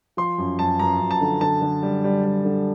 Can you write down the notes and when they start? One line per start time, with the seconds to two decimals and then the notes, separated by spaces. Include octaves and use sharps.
0.17 F3 C6
0.38 F#2
0.59 F#2 A5
0.79 F#2 A#5
1.00 F#2
1.11 A5
1.21 D3
1.41 D3 A5
1.62 D3
1.83 G3
2.04 G3
2.24 G3
2.45 D3